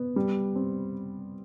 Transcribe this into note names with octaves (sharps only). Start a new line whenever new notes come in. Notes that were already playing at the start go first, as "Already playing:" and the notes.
Already playing: B3
G3
C4